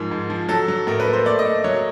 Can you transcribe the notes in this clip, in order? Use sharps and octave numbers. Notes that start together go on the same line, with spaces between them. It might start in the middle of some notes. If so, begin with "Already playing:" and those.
Already playing: G#2 F3 G#3 A#4
G#2
F3
F#3 A4
F#3
A2 A#4
B4
A#3
C5
A3 D5
D#5
A3
F#3 C#5